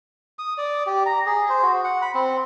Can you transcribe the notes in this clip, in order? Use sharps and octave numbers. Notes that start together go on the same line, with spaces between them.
D#6
D5
G4
A#5
G#4
C5
F#4
F#5
B5
C4